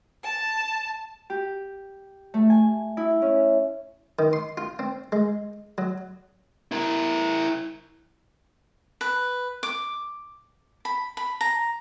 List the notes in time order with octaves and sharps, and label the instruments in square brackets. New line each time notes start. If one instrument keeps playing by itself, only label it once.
[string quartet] A5
[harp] G4
A3
G#5
E4
C#4
[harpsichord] D#3
C6
F4
C4
G#3
F#3
[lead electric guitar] E4 A#4
[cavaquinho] B4
D6
B5
B5
A#5